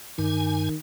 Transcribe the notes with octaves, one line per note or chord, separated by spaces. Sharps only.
G2 D#3 G#5